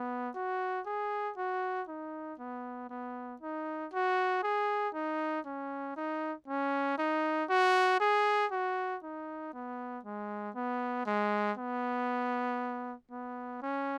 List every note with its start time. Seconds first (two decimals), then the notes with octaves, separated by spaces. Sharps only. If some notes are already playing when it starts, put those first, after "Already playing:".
Already playing: B3
0.35 F#4
0.86 G#4
1.37 F#4
1.88 D#4
2.39 B3
2.90 B3
3.41 D#4
3.93 F#4
4.43 G#4
4.94 D#4
5.46 C#4
5.97 D#4
6.48 C#4
6.98 D#4
7.50 F#4
8.00 G#4
8.52 F#4
9.03 D#4
9.53 B3
10.05 G#3
10.56 B3
11.06 G#3
11.57 B3
13.11 B3
13.62 C#4